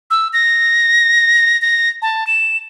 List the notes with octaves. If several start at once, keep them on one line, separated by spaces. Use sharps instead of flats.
E6
A#6
A#6
A5
E7